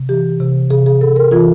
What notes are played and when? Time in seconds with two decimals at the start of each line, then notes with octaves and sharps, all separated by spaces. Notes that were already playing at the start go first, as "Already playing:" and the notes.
Already playing: C3
0.09 E3 G4
0.40 C3
0.70 C3 G#4
0.86 G#4
1.01 C3 A4
1.16 A#4
1.31 E3 F4